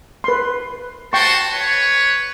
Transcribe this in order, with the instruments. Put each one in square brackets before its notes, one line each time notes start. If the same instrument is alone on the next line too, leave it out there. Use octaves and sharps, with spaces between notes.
[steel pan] B4 C6
[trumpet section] F#4 A5 C6 [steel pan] G5 C#6
[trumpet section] B4 C#5